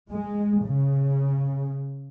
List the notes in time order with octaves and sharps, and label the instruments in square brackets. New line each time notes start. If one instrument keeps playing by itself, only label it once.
[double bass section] G#3
C#3